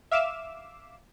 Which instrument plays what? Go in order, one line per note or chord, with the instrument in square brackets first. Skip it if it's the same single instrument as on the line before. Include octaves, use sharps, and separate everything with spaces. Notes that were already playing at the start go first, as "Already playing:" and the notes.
[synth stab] E5 F5 D6 E7